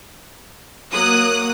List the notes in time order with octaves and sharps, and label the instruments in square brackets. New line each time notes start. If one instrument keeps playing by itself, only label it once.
[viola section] F#3 A#3 [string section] D#6 F#6